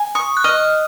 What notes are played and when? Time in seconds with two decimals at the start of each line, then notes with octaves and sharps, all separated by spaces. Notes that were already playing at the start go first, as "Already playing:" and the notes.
Already playing: G#5
0.15 C#6 D#6
0.37 F#6
0.44 D#5 F6